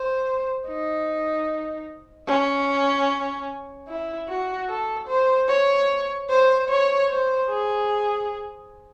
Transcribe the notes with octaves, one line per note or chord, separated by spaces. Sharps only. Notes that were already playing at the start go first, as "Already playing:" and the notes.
Already playing: C5
D#4
C#4
E4
F#4
A4
C5
C#5
C5
C#5
C5
G#4